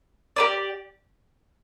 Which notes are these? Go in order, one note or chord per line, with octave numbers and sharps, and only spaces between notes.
G4 B4 D5